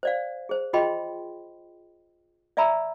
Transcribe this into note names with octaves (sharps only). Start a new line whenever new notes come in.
C5 D5 F5
G#4 C5
F4 G#4 D#5 G5 B5 C6
D5 E5 G#5 A#5 B5 E6